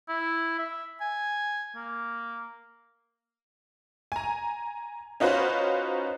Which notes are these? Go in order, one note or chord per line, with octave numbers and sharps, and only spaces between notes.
E4
E5
G#5
A#3
G#5 A#5
C#4 D#4 F4 F#4 B4 C5